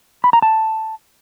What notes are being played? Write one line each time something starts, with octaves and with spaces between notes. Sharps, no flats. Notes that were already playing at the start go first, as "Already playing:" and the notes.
B5
A#5
A5